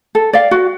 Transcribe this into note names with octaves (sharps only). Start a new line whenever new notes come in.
A4
D5 F5
F#4